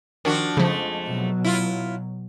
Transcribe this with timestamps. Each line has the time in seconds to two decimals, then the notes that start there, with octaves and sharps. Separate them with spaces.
0.25 D#3 F3 D4 F#4
0.57 F2 C#3 F3 G#3 A3
1.06 B2 F#3
1.44 E4 F4